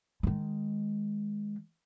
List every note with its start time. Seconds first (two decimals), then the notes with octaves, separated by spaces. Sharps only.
0.23 D#3 G#3